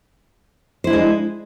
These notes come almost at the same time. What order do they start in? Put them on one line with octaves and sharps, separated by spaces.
C5 E4 D4 G#3